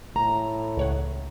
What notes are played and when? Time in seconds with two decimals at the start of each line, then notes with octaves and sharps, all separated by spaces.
0.16 A2 A#5
0.77 C#2 C#5 F#5